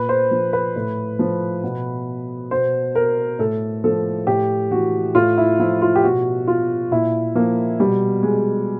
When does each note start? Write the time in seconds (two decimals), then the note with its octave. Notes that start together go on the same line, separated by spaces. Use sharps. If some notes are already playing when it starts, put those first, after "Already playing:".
Already playing: A#2 B4
0.09 C5
0.31 F3
0.53 B4
0.76 A2
1.19 F3
1.63 B2
2.51 B2 C5
2.95 A#4
3.39 A2 A4
3.84 F3 A4
4.27 A2 G4
4.71 E3 F#4
5.15 A2 F4
5.38 E4
5.59 F3 E4
5.82 F4
5.95 G4
6.04 B2 F#4
6.47 F4
6.91 A#2 E4
7.35 F3 A#3
7.80 B2 G3
8.23 G#3